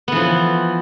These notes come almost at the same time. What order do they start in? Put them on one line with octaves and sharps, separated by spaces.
B3 E3 F3